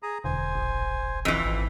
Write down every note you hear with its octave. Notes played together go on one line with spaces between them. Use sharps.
G#4 A#5 D#6
E1 D2 C5 G#5
A#1
F2 E3
G#1